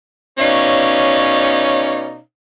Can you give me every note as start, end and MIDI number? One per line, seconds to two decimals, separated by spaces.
0.39 2.18 47
0.39 2.18 61
0.39 2.18 63
0.39 2.18 73
0.39 2.18 74
0.39 2.18 77